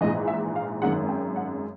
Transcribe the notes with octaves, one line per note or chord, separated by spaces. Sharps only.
A#1 G#2 E3 D#5
E5
F5
G#1 F#2 D#3 G#3 F#5
G5
F#5